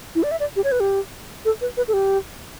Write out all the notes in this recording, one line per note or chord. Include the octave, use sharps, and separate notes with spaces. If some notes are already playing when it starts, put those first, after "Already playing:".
E4
D5
E5
D5
G4
C#5
B4
G4
A4
B4
B4
A4
G4